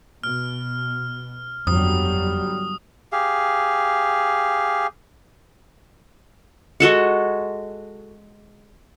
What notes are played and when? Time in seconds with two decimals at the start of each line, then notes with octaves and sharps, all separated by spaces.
0.23 B2 F6
1.67 G1 F2 F#3 G3 D#6
3.12 G4 G#4 F5
6.80 G#3 F#4 A4 F#5